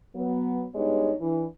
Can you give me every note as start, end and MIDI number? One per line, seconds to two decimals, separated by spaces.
0.16 0.64 54
0.16 0.64 59
0.75 1.13 43
0.75 1.13 56
0.75 1.13 59
0.75 1.13 63
0.75 1.13 67
0.75 1.13 73
1.21 1.45 52
1.21 1.45 62